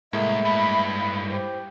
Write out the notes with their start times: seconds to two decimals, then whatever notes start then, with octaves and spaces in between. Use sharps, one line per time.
0.13 C2 A2 G#3 A#3 E5
0.45 G2 B5
0.97 E4 B5
1.30 G4 C5